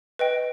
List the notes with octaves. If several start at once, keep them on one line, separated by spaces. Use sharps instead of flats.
B4 D#5 G5